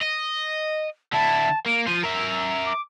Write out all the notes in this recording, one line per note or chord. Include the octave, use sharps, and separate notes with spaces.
D#5
D3 E4 A5
A#3 D7
F3 C5 D#7
A#4 E5 E6
D6